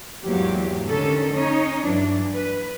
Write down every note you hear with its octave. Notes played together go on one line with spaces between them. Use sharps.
E2 G#2 E3 F#3 A#3 G4
D3 D#3 C#4 A4
C#4 D#4 C#5
G2 E3 F#3 D4
B4